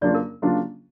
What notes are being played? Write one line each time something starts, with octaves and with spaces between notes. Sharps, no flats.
C#3 F#3 A#3 D4 F4 D5
A#4
C#3 F#3 A#3 D4 F4